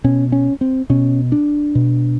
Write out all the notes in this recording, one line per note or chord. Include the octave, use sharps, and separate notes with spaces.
B2 C#4
C#4
C4
B2 C#4
D4
B2